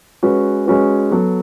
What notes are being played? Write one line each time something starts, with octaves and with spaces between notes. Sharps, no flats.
G#3 C#4 F#4 B4
G#3 C#4 F#4 B4
F#3 B3 F#4 A4